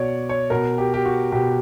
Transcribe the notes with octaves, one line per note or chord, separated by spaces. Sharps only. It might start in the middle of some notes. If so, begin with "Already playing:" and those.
Already playing: B2 C#5 D5
C#5
B2 A#4
G4
G4
F#4
B2 G4